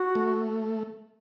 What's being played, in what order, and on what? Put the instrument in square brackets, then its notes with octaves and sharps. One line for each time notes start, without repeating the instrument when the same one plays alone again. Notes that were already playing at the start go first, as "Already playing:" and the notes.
Already playing: [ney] F#4
[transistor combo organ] A3